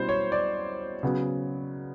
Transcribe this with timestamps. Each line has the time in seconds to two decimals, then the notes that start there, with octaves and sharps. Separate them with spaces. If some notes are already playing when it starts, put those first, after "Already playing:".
Already playing: B2 G3 C#4 E4 C5
0.09 C#5
0.32 D5
1.03 C#3 F#3 B3